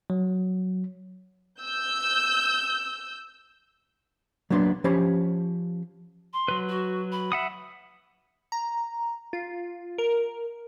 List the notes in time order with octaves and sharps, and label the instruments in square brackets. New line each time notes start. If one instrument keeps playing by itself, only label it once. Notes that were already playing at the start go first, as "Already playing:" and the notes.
[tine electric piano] F#3
[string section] E6 G6
[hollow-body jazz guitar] F#3 A#3 B3 D4 B5 C6
F3 C#4 G4 C5 C#5 B5
[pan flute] C6
[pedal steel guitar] F#3 B4
[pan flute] F#4
B5
[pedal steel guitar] E5 F#5 D#6
[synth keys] A#5
F4
A#4